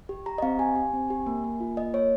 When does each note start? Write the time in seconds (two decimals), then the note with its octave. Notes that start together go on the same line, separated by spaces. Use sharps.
0.09 G4
0.26 G4 A#5
0.38 D#5
0.42 C4 F5
0.59 G4 G#5
0.76 G4
0.93 C4
1.10 G4
1.26 A#3
1.44 A#3
1.60 F4
1.77 A#3 D#5
1.94 A#3 C#5